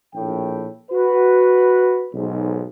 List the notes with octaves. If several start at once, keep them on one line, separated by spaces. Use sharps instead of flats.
A#1 A2 G5
F#4 B4
B1 G#2